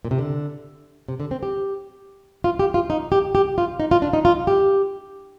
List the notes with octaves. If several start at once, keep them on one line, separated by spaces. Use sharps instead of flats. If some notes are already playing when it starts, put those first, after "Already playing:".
A#2
C3
D3
C3
D3
C4
G4
F4
G4
F4
D#4
G4
G4
F4
D#4
F4
D4
D#4
F4
G4